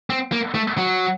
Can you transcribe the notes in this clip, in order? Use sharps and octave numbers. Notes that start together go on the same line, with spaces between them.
C4
A#3
A3
F#3